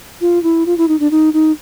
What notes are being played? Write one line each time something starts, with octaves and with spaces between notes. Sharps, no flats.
F4
E4
F4
E4
D#4
D4
D#4
D#4